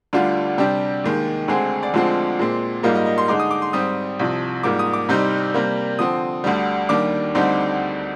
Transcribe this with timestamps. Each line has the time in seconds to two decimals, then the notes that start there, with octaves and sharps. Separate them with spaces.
0.13 D2 D3 G3 D4 F4
0.58 C3 G3 D4 G4
1.04 D#2 D#3 G#3
1.48 D2 D3 G#3 C4 G#4
1.83 D5
1.94 D2 D3 F3 G#3 C4
2.39 A#2 G#3 C4
2.83 G#2 G3 A#3 F4 D#5
2.96 D#5
3.06 D#5
3.18 C6
3.28 D3 G#3 D#4 D6
3.40 D#6
3.51 D6
3.62 C6
3.73 G#2 G3 C4 D#6
4.19 C2 C3 F3
4.63 G#2 G3 A#3 F4 D6
4.79 D#6
4.93 D6
5.09 C2 C3 G3 C4 D#4
5.54 C3 G3 A#3
5.99 D3 F3 C4 D#6
6.44 D2 D3 G3
6.89 D#2 D#3 G3 D4 D6
7.35 D2 D3 G3 C4 D#4